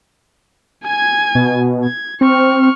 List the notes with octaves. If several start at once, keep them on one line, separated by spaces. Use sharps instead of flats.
G#5 G#6
B2
G#6
C4 C#6 F6